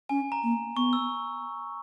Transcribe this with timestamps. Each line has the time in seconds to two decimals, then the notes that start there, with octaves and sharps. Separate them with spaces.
0.09 C#4 G#5
0.32 A#5
0.43 A#3
0.76 B3 C#6
0.93 E6